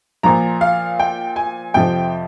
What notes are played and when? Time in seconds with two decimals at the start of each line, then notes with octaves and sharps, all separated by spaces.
0.23 A#2 F3 A#5
0.61 F5
0.99 G5
1.36 G#5
1.74 F2 C3 F3 G5